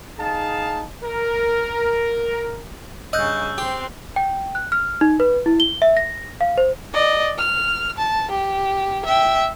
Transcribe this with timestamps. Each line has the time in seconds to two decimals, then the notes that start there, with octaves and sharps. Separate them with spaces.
0.19 D#4 G#4 F5 A5
1.03 A#4
3.13 G2 C#3 D#5 E6 F#6 G6
3.58 C4 G4 C6
4.16 G5
4.55 F#6
4.72 F6
5.01 D#4
5.20 B4
5.46 E4
5.60 G7
5.82 E5
5.97 A#6
6.41 F5
6.58 C5
6.93 D5 D#5
7.38 F6
7.98 A5
8.30 G4
9.05 E5 G5